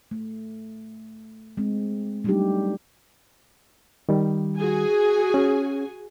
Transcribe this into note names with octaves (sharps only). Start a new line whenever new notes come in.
A3
G#3 C4
F#3 G3 A3 D4 D#4 G4
D#3 G3
F#4 G#4 G#5
C#4